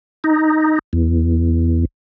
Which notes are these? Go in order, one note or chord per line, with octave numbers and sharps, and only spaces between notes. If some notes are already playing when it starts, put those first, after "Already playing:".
D#4
E2